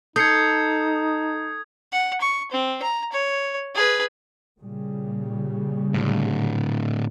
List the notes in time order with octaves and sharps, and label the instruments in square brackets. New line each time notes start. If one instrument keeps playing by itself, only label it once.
[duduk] D#4 [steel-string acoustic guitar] A4 [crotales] D#6 G#6 [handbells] G6 C7 C#7
[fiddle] F#5
C#6
C4
A#5
C#5
G#4 B4
[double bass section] A#2 C#3 G3
[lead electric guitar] A2 D3